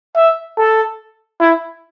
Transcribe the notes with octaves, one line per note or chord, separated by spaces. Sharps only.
E5
A4
E4